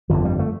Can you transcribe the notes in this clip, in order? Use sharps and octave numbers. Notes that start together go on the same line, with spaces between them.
G1 F2 D3 F3
G3
A3